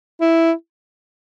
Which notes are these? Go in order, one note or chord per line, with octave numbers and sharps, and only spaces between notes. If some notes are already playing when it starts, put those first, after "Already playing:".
E4